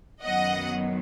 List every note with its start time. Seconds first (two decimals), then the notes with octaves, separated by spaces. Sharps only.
0.22 F#2 D#3 F#3 B3 D#5 F#5